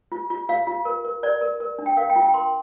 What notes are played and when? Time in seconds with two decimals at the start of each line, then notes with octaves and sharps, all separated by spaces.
0.12 F4
0.30 F4
0.49 F4 F5
0.67 F4
0.85 A#4
1.05 A#4
1.23 A#4 D5
1.41 A#4
1.60 A#4
1.79 D4
1.86 G5
1.97 A#4 F5
2.10 G5
2.16 F4
2.22 G5
2.34 A#4 C6